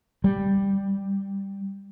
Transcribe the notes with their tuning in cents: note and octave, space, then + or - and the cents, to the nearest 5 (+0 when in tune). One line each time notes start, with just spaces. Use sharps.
G3 +5